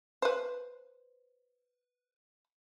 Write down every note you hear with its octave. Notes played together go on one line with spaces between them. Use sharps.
B4 C5